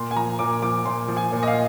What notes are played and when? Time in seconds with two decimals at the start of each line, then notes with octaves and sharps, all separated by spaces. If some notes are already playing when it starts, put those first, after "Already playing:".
Already playing: A#2 C6
0.11 G#5
0.17 F3 A#5
0.39 A#2 D6
0.62 F3 D6
0.85 A#2 C6
1.08 F3
1.17 G#5
1.32 A#2
1.43 D#5
1.48 F5